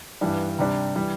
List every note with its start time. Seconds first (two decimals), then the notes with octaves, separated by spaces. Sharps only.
0.21 G2 E3 G3 D4
0.59 C3 G3 D4
0.96 E3 G3